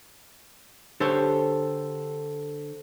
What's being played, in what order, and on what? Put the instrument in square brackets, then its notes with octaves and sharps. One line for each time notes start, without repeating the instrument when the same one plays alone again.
[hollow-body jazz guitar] D3 G4 C#5 [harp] A4 C5 A5